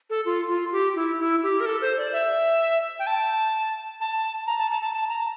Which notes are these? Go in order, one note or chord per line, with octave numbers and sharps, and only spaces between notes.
A4
F4
F4
G4
E4
E4
G4
A#4
A4
C5
D5
E5
G5
A5
A5
A#5
A5
A5
A5
A5
A#5